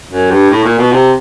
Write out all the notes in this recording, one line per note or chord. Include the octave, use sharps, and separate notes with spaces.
F#2
G2
A2
A#2
B2
C3